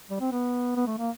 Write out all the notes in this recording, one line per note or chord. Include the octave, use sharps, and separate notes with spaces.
G3
C4
B3
B3
A3
A#3